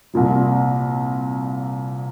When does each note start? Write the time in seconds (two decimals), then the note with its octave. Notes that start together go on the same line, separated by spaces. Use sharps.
0.14 C2 A#2 F3